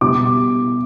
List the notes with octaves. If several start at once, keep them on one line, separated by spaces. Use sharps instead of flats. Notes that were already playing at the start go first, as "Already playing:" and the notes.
B2 G3 D6